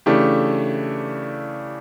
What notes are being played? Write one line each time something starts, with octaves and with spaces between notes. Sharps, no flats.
C#3 E3 A3 D4 G4